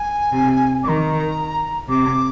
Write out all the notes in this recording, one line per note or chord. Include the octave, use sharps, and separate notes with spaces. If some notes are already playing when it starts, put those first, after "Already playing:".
Already playing: G#5
C3
D#3 A#5 D6
C3 D6